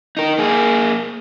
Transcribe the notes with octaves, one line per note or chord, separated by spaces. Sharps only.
D#4 A#4
A#3 G#4